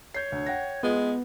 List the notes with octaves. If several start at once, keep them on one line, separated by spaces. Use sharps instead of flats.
C#5 G6 C7
D2
F#5 G5 A#6
G#3 B3 F4